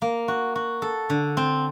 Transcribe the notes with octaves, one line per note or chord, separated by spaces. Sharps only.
A#3
F#4
F#4
A4
D3
C4